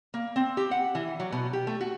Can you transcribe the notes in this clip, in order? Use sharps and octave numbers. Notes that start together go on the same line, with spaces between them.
A#3
C4
G4
F#5
E3
F#3
B2
G4
A3
F#4